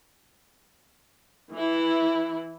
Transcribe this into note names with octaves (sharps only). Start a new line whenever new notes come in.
E3 E4